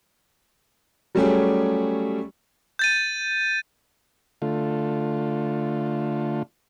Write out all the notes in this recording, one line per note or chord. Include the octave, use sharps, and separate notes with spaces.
F#3 G3 A3 C#4 G4 G#4
G6 A6 D#7
D3 A3 F4